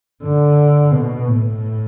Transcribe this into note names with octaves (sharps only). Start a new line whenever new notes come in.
D3
B2
A2